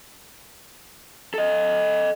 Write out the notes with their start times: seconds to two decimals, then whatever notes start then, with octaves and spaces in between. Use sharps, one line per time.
1.34 A4 D#5